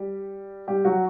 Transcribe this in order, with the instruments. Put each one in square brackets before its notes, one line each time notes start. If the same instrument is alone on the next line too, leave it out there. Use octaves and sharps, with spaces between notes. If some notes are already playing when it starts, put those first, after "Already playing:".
Already playing: [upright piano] G3 G4
G3 G4
F#3 F#4